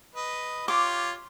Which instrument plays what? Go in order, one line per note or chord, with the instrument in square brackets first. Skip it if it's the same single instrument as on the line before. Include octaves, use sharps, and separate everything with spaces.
[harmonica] B4 D#5
[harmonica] F4 G4 C#5 [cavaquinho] D6